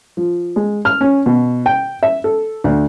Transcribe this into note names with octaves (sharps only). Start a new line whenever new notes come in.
F3
G#3
F6
C#4
B2
G5
E5
A4
D2